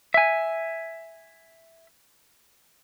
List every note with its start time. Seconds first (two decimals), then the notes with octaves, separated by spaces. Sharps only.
0.14 E5 G#5